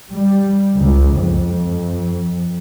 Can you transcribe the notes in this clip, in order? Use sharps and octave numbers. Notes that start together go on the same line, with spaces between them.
G3
C#2
F2